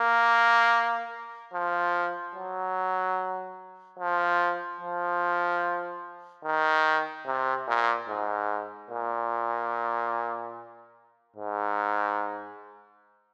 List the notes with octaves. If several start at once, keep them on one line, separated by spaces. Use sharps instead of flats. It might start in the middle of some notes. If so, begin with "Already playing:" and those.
Already playing: A#3
F3
F#3
F3
F3
D#3
C3
A#2
G#2
A#2
G#2